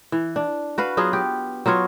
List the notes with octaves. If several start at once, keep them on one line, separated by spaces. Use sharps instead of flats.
E3
D4
F#4 B4 F5
F#3 B3 F4 G#4
G4
F#3 B3 F4 C#5